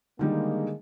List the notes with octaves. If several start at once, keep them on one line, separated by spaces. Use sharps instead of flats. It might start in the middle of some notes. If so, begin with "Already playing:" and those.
D3 D#3 G3 G#3 A#3